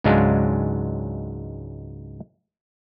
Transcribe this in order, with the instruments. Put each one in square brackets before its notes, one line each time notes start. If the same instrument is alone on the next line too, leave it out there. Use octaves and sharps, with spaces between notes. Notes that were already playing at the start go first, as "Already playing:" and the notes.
[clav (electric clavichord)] C#2 G#2 F#3 G#3 D4 F5